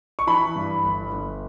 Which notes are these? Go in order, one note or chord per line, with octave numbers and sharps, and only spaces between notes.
C#6
E3 B5
G2
G1
G1